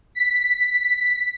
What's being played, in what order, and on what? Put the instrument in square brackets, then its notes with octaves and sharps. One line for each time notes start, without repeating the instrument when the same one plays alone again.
[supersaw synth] B6